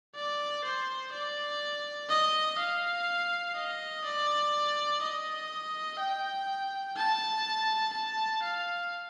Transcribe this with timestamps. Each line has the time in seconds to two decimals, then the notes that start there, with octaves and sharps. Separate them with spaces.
0.15 D5
0.64 C5
1.13 D5
2.10 D#5
2.59 F5
3.55 D#5
4.05 D5
5.02 D#5
6.00 G5
6.97 A5
7.93 A5
8.43 F5